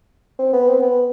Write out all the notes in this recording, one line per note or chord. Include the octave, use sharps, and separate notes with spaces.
C4
B3
C4
B3